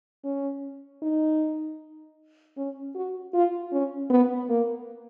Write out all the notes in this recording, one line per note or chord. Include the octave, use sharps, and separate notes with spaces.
C#4
D#4
C#4
F#4
F4
C#4
B3
A#3